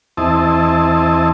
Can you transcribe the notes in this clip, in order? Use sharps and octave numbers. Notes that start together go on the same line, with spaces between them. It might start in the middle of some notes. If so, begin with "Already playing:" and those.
E2 C4 E4 D#5 A5